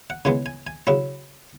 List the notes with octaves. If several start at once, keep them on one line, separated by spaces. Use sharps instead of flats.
F#5
C#3 E3 G#3 B3 G#5
G#5
G#5
C#3 F#3 C#4 E4